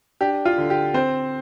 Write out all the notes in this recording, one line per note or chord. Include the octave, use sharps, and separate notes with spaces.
D4 G4
F4
D3
G4
C4 C5